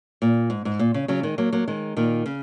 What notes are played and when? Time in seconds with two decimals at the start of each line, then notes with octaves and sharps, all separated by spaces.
0.22 A#2
0.50 G#2
0.65 G#2
0.79 A#2
0.94 C#3
1.08 C#3 F#3
1.23 D#3 G#3
1.38 F#3 A#3
1.53 F#3 A#3
1.68 D#3 G#3
1.97 A#2 D#3
2.26 C#3